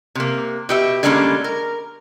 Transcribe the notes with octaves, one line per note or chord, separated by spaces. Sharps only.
C3 A#3
B2 G4 E5
D3 G3 G#3 A#3 C4 C#4
A#4